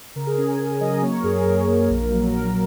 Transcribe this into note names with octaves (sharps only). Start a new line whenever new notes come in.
C#3 A#4
G#4
C#4 A#4
G#5
C#4 G#5
F#3 D#5
A#4
A#3 C#5
A#4
F#2 G#4
A#4
F#2 A#4
A#3
A#1
F#3
A#1 A#4